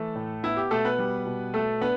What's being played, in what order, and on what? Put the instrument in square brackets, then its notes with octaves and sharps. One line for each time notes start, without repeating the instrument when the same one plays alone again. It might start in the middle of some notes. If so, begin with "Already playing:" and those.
Already playing: [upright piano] E3 A3 A4
A2
B3 E4
G4
B2 A3 A4
B3 B4
G3
B2
A3 A4
B3 D4 B4